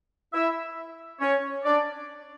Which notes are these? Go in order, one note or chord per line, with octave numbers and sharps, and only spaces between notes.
E4 E5
C#4 C#5
D4 D5